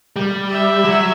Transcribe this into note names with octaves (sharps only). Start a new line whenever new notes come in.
G3
E5
F#3